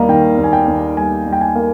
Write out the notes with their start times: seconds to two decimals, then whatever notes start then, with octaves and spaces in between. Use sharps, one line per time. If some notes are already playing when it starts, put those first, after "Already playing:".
Already playing: D#2 G3 A#3 D#5 F5 A#5
0.09 D#3 G5
0.38 D#2
0.44 G#5
0.53 G5
0.68 D#2
0.97 G3 G#5
1.26 G3
1.33 G5
1.41 G#5
1.56 A#3